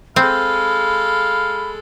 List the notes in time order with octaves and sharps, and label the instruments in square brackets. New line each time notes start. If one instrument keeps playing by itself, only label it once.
[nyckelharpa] G#3 A4 [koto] C4 [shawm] F5 [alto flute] B5